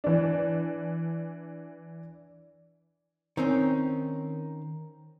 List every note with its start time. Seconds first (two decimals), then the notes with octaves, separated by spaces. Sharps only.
0.04 E3 D4
3.37 D#3 C4 C#4